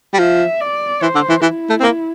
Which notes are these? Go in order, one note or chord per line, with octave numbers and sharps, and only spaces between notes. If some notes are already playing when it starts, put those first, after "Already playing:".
G3
F3 E5
D5
E3 C5
D3
E3
E3 E4
A3
C4
A#3